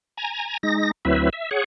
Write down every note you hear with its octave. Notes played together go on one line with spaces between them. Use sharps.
G#5 A#5
G#3 D#4 A#6
D2 F#3 C4 E4 B4 E5
E5
G#4 C#5 F#5